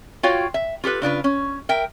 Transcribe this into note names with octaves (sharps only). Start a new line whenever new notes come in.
F4 F#4 C#5 F5 G5
E5
F4 G4 A4 B4
C#3 D4 F4 B4
C#4
A#4 E5 G5